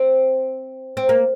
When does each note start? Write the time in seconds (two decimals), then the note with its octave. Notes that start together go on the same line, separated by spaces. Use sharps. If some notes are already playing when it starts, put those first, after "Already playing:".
Already playing: C4
0.97 C4
1.09 A#3